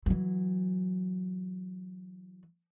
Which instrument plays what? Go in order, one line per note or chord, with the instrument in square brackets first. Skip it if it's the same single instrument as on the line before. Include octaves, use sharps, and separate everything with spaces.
[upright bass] E3 F#3